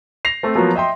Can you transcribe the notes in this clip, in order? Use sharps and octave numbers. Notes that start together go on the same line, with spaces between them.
A#6 C7 F7
A3 C4
F3 F#3 A#3 B3 F#4
D#5 E5 G5 C6